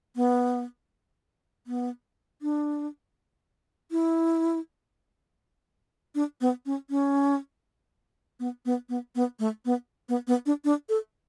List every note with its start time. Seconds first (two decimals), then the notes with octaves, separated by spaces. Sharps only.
0.16 B3
1.67 B3
2.42 D4
3.91 E4
6.15 D4
6.41 B3
6.66 C#4
6.90 C#4
8.40 B3
8.66 B3
8.89 B3
9.15 B3
9.39 A3
9.65 B3
10.09 B3
10.27 B3
10.46 D4
10.65 D4
10.89 A4